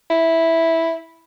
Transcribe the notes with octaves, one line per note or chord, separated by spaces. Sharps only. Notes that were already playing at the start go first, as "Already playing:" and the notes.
E4